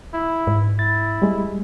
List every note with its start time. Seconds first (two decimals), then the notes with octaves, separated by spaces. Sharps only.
0.14 E4
0.47 G#2
0.79 E4 A6
1.22 G3 G#3